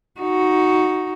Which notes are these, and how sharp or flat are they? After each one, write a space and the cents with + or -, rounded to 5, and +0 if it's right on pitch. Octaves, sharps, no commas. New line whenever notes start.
D#4 +5 F#4 +0